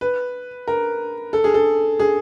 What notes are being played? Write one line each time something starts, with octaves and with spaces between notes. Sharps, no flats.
B4
A#4
A4
G#4
A4
G#4